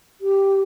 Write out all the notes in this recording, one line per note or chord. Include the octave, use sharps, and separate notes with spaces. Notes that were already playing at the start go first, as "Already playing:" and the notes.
G4